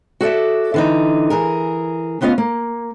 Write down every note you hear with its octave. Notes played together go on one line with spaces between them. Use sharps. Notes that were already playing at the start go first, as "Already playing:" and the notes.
F#4 A4 D5 E5
D3 E3 D#4
E3 G#4 A#4
D2 B3 C#4 F4 D#5 F5
A#3